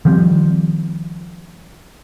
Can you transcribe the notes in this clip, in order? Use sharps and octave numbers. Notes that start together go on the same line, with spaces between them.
D#3 F3 G3 C4